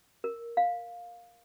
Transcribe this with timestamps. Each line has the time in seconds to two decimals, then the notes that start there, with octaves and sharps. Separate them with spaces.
0.24 A#4
0.57 F5